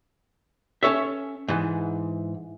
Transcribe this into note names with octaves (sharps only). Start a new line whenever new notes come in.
C#4 A4 C#5 E5
G#2 E3